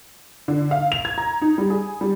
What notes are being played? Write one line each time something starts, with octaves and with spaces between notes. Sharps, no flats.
D3
F5
F7
G#6
A#5
D#4
G3
G#4
G3